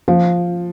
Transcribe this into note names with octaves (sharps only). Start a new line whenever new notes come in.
F3